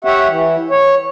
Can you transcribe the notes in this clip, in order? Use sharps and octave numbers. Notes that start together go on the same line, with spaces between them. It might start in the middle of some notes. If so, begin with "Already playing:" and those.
G4 C#5 E5 F#5
E3
C#5